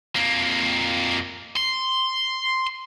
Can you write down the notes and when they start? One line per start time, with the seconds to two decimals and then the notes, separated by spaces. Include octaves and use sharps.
0.16 F2 A#3
1.56 C6